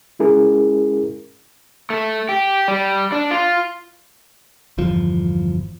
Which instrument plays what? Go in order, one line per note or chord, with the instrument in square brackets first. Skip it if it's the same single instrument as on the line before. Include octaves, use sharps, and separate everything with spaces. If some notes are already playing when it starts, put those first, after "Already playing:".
[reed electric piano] G#3 C#4 E4 G#4 A#4
[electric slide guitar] A3
G4
G3
D4
F4
[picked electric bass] G1 E2 F3